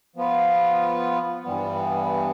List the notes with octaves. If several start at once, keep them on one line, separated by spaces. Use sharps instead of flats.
F3 B3 F4 B4
G2 E3 G3 B3